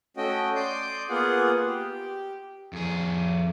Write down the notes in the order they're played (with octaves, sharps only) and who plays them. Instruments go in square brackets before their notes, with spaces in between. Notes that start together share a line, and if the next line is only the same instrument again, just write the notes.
[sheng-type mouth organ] A3 C#4 F#4 D#5 G5
D5 C6 D6 D#6 G6
A#3 B3 F4 G#4 F#5
G4
[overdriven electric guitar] F2 G#4